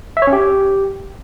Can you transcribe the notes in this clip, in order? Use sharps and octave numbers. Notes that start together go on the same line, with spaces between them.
E5
C#5
C#4
G4